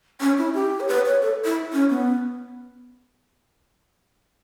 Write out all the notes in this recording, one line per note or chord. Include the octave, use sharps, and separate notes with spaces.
C#4
E4
G4
C#5
B4
C#5
A4
E4
C#4
B3